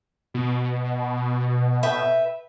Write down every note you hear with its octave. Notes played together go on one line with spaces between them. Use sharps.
B2
B4 E5 G5